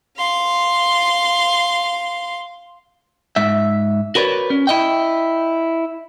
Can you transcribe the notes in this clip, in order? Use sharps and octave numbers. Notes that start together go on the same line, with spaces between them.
F5 C6
G#2 E5
F#4 A#4 B4 C#5 D5
C#4
E4 D#5 G5